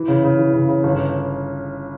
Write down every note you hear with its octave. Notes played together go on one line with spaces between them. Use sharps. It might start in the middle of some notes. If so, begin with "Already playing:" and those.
Already playing: E3
C#3
C#3
E3
C#3
C#3
G1